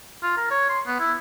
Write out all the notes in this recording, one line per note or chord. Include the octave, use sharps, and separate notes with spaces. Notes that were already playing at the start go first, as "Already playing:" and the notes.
F4
A#4
C#5
C6
B3
E4